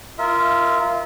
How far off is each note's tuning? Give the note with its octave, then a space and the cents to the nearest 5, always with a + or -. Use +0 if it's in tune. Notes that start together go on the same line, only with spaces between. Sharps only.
F4 -20 A#4 +0 E5 -30